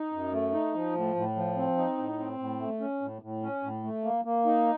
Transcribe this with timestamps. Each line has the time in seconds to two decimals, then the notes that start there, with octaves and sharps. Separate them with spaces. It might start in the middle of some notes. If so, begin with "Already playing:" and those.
Already playing: D#4
0.12 F#2
0.33 A3
0.53 D#4
0.74 F3
0.95 A2
1.16 A2
1.36 F3
1.57 C4
1.78 D#4
1.97 A2
2.19 C4
2.39 A2
2.60 A3
2.80 C#4
3.02 A2
3.22 A2
3.42 C#4
3.63 A2
3.84 A3
4.04 A#3
4.25 A#3
4.46 D#4